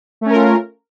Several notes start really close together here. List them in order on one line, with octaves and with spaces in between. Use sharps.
A3 C#4 A#4 F4